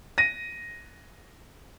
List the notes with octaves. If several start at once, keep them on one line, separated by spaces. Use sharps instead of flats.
A#6 D#7